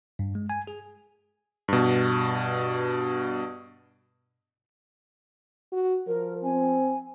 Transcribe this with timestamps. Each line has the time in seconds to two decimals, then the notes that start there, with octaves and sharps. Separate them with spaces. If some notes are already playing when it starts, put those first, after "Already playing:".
0.19 G2
0.35 G#3
0.50 G#5
0.67 G#4
1.68 G2 B2
5.72 F#4
6.07 F3 A#4
6.43 C4 G#5